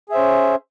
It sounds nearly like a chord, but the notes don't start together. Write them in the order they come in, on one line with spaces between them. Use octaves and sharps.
G#4 E5 C5 C#4